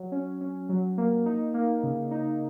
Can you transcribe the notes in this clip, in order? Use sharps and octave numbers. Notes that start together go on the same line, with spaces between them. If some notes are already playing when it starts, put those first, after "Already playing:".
Already playing: F#3
C#4
C#4
F#3
A#3
D#4
A#3
C#3
D#4